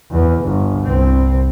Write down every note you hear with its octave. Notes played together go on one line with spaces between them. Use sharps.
E2
G1
C2 C4